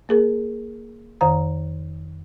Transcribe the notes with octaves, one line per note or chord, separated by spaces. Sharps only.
A#3 G#4 A#4
F2 D#3 C5 A#5